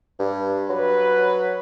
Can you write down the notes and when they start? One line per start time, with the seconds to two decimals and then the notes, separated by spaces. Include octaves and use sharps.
0.19 G2
0.70 F#3 B4